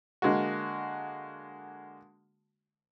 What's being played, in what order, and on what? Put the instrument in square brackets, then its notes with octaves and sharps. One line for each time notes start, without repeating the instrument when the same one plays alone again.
[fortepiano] D3 G#3 A#3 F#4